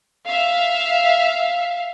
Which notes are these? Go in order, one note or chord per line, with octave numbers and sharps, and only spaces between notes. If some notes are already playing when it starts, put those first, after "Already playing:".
E5 F5